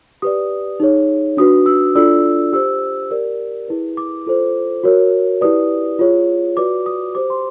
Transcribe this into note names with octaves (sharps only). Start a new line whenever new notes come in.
G4 B4 D5 D#6
D#4 G#4 C#5
D4 F#4 B4 D#6
E6
D4 F4 A4 D5 E6
G4 C5 E6
G4 A#4 D5
E4 G#4 B4
D6
F4 A4 C5
F#4 A#4 C#5
E4 G4 B4 D5 D#6
F4 G#4 C#5
F#4 B4 D5 D6
D#6
G4 C5 D6
C6